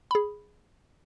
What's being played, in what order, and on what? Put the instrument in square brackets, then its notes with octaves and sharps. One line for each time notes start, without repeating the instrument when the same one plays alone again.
[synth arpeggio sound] G#4 B5